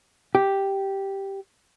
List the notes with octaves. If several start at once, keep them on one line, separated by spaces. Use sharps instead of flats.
G4